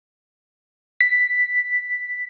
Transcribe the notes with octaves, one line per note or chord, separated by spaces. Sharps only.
B6